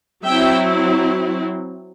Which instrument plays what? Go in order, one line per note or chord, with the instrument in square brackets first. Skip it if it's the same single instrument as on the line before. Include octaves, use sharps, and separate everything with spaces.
[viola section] F#3 C4 E4 E5 G5